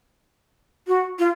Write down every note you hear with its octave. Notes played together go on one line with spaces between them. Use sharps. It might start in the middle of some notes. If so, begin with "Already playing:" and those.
F#4
F4